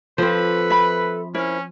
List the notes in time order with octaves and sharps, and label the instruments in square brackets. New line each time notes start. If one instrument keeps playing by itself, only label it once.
[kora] F3 C4 [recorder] A4 [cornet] B4
[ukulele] E5 B5
[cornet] C#4 [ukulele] E4 A#4 [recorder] C5